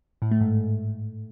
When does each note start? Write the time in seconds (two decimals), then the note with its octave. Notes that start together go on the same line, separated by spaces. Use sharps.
0.22 A2
0.31 A3
0.41 G#2